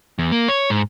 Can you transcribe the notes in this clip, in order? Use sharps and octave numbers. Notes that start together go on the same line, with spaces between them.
E2
A#3
C#5
G#2